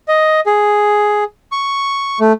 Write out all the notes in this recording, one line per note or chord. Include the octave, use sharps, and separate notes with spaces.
D#5
G#4
C#6
A3